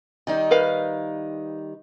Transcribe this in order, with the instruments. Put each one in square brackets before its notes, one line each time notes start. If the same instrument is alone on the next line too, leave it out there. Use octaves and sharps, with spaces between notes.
[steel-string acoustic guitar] D#3 G3 D#4
[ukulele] A#4 B4 F5